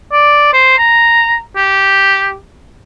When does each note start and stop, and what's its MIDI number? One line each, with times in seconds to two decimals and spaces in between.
0.12 0.49 74
0.53 0.75 72
0.78 1.39 82
1.56 2.35 67